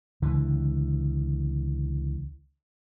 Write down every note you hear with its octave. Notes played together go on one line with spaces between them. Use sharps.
C#2 D3 E3